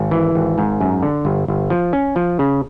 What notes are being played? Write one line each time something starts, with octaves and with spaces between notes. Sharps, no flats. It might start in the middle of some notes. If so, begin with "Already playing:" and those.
Already playing: G#1
E3
G#1
G#2
F#2
D3
G1
G1
F3
C#4
F3
C#3